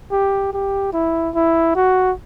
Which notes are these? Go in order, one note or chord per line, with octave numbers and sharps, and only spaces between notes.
G4
G4
E4
E4
F#4